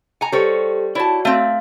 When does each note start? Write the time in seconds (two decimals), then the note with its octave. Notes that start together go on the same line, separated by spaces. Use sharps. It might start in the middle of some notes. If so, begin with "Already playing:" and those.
0.21 G#5 A#5 C#7
0.32 G3 G4 A4 C5 C#5
0.95 E4 F#4 C#5 D5 A5
1.25 A3 C4 F5